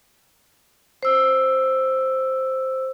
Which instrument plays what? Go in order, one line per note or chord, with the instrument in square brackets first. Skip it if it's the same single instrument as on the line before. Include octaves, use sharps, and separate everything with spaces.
[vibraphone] C5 E6